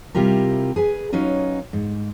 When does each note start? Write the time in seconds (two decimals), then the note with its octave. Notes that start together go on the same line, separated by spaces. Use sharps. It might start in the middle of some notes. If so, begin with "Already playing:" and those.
0.15 C3 G3 E4 F4 G4 A#4
0.76 G#4 B4 G#5
1.12 F#3 C#4 D#4 F4 B4
1.73 G#2